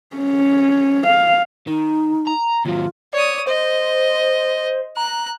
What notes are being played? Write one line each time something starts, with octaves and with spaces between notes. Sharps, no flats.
C#4
F5
D#3 D#4
A#5
D#2 F#3 F4
C#5 D5 D#6
C5 D#5
A#5 F#6